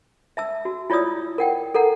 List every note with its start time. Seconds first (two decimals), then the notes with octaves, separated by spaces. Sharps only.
0.37 E5 A5 E6
0.65 F#4
0.90 E4 F4 C#5 D5 D#6 E6
1.38 A#4 F#5 G5
1.74 A4 A#4 F#5 A#5